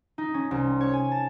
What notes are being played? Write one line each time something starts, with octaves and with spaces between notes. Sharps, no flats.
D#4
C#4
C2
C#5
G#5
A5